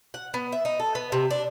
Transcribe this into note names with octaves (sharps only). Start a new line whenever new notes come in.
F#5
B3
E5
D#4
A4
B3
C3
D4